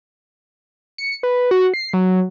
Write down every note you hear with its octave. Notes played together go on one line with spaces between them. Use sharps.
C#7
B4
F#4
C7
F#3